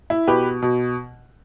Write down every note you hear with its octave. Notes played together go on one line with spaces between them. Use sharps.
E4
B2 G4 B4
B2